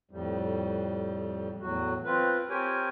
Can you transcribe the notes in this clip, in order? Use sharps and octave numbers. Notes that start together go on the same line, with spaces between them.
F2 A2 G3
E2 A2 F#3 F#4
C4 F4 B4
C4 G4 A#4 C#5 G5 G#5